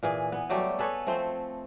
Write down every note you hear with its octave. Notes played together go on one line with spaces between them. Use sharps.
A#2 E3 G#4
B3
F#3 G3 A3 G4
G#4 A4 B4 C#5
F3 A3 C4 C5